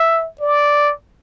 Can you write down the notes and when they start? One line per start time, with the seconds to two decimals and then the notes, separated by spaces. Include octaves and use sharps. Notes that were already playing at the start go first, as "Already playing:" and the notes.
Already playing: E5
0.40 D5